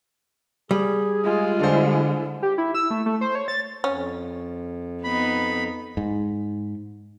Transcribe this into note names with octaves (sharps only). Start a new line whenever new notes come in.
G3 G#4
G#3 F4
D3 D4 A4 C5
G4
E4
E6
A3
A3
C5
C#5
A6
F2 C#4
B3 D#4 B5
G#2